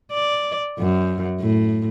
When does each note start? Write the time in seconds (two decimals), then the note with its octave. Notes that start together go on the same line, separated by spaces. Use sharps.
0.12 D5
0.79 F#2
1.40 A2